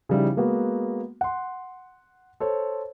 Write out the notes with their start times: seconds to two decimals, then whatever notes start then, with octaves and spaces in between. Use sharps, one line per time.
0.09 C#3 F3 G3 D#4 E4
0.37 G#3 A#3 B3 F#4
1.21 F#5 C6
2.40 A4 C5 C#5